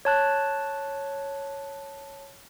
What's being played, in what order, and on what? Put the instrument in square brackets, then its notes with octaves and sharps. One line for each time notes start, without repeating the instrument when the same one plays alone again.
[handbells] C#5 A5 F#6